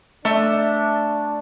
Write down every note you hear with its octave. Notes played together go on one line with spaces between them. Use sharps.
A3 D4 E5